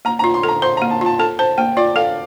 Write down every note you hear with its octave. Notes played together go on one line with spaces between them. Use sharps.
A#3 A#5
A#5
F4
C6
A4
A#5
C5 C6
A#5
A#3
A5
F4 A5
A4 A5
C5 A5
A#3 G5
F4 D5
A4 F5